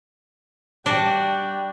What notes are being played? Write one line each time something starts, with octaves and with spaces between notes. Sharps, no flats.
G3 D4 F#4